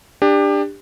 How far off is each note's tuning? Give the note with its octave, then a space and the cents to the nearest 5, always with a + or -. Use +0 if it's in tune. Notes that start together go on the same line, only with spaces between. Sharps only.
D4 +10 G4 +25